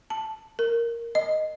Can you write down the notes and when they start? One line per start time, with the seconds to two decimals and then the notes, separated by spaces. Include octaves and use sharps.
0.10 A5
0.59 A#4
1.15 D#5